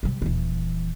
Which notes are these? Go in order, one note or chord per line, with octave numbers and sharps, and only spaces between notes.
C3 G3
D#1 E3